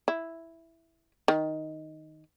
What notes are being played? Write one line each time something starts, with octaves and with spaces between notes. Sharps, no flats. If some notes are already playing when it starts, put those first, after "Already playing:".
E4
D#3